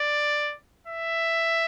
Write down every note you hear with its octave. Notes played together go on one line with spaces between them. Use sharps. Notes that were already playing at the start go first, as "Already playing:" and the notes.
Already playing: D5
E5